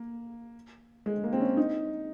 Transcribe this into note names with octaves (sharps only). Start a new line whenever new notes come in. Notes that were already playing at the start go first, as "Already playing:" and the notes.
Already playing: A#3
G#3
A#3
C4
C#4
D#4